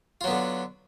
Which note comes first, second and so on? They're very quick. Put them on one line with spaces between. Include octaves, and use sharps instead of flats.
F4 F#3 B3 D3